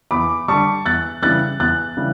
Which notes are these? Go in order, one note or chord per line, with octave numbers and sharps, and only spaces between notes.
E2 B5 D6
D3 G3 A5 C#6
E2 F#6 A6
C#3 E3 G3 F#6 A6
E2 F#6 A6
C#3 E3 G3